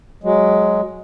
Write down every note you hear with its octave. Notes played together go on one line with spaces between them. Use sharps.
F#3 G#3